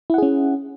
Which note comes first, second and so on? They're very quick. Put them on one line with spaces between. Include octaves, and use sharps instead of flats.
E4 F#5 G#4 C#4